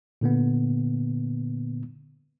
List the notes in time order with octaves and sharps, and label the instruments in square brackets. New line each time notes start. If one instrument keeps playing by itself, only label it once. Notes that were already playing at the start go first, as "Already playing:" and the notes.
[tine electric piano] A#2 D3 A#3 B3